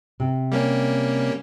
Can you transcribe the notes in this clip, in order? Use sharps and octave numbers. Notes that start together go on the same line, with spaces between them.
C3
G3 A#3 C#4